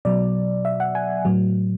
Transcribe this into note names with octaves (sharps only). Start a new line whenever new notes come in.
B2 F#3 D5
E5
F#5
G#5
A2 F#3